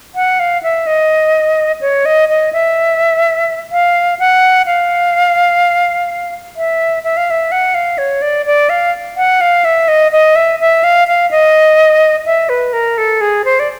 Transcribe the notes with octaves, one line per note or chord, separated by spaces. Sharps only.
F#5
F5
E5
D#5
C#5
D#5
D#5
E5
F5
F#5
F5
E5
E5
F5
E5
F#5
F5
C#5
D5
D5
F5
F#5
F5
E5
D#5
D#5
E5
E5
F5
F5
D#5
E5
B4
A#4
A4
G#4
C5
D5